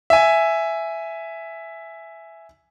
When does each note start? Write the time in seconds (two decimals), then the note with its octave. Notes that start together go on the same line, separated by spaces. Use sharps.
0.10 E5 G#5